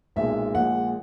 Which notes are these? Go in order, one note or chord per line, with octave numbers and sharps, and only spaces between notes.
B1 A#2 G#3 E5
A#1 A#2 G#3 F#5